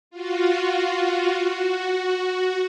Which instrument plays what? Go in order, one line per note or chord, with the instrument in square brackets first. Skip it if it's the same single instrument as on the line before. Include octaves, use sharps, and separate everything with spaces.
[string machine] F4 F#4
F#4